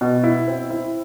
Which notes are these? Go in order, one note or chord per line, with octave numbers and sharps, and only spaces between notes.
B2
E4
C4
E4